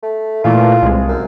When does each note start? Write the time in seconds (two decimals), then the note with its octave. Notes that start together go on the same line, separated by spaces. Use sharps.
0.03 A3
0.44 A#2 E3 A3 F4
0.82 C2 G#3
1.09 F#2